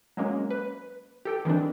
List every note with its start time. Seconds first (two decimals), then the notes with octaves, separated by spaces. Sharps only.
0.17 F#3 G#3 A#3 C#4
0.51 B4
1.25 G4 A4 G5
1.45 D#3 E3 C4 D4